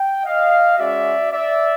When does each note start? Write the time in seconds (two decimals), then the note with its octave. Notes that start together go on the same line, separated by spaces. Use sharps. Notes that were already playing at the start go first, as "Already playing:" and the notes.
Already playing: G5
0.25 D#5 F5
0.78 G#3 C#4 F#4 D5 E5
1.32 D5 E5